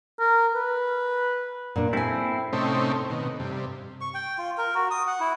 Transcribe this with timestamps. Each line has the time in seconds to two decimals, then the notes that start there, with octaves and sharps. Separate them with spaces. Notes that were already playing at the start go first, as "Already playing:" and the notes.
0.19 A#4
0.55 B4
1.76 A#2 D4
1.93 C4 E4 A4 G#5
2.53 A2 C3 A3 C4 C#4 D#4
3.10 B2 D#3
3.40 G2 C3
4.01 C#6
4.14 G5
4.38 F4
4.58 A#4
4.75 F#4
4.91 D#6
5.07 F#5
5.20 E4